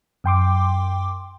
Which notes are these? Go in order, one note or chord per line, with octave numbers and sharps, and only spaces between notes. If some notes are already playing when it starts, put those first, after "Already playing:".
F#2 G5 C6 D6